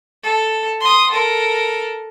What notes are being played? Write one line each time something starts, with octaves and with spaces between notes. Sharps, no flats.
A4
C6 D#6
A4 A#4